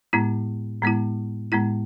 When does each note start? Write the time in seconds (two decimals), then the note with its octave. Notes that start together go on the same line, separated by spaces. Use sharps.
0.13 A2 G#3 B3 E4
0.83 A2 G#3 B3 E4
1.52 A2 G#3 B3 E4